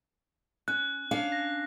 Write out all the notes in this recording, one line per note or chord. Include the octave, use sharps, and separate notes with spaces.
C#4 F#6
C#4 D4 F5
A#6